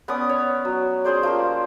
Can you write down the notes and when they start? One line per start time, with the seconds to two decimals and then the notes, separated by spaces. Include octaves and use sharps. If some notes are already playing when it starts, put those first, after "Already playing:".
0.08 B3 C#4 D5 D#6
0.29 C#5
0.65 F#3
1.04 C#4 G#4 C5 D5
1.23 F3 A#3 G4